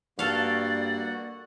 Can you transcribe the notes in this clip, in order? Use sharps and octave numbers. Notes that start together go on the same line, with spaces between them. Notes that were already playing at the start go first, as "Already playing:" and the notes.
G2 A#3 F#4 A4 D5 F5 F#5